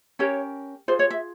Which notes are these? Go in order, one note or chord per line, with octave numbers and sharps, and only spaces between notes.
C#4 G4 A#4 C#5
F4 G#4 C5
C#5
E5